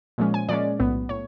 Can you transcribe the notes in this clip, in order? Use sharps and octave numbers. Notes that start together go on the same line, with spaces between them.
A#2 F3 G#3 C#4
G#5
A#2 F3 G#3 C#4 D5
B1 A2 F#3 B3
A2 C#5